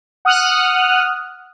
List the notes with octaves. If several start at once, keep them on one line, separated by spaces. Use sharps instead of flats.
F#5 D#6 F6 F#6